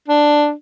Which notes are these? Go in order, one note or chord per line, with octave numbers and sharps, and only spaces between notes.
D4